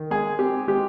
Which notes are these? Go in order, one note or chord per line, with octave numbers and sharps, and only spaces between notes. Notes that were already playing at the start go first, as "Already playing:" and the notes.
Already playing: D#3
G#3 G#4
C4 G4
G#3 G4